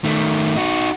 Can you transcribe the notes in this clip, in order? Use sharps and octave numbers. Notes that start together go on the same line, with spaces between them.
D#3 A3
D#4 F#4